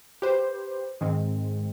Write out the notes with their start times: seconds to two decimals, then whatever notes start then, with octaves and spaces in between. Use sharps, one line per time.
0.22 G4 B4 C5
1.01 G#2 D#3 G#3 C4